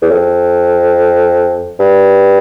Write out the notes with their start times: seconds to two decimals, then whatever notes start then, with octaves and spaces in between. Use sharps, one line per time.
0.02 E2
0.11 F2
1.79 G2